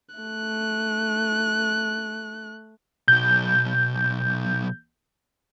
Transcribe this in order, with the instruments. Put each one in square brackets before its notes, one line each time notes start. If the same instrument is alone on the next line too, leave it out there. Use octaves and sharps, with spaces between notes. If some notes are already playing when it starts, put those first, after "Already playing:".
[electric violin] A3 F#6
[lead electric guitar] B1 F#3 [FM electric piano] G6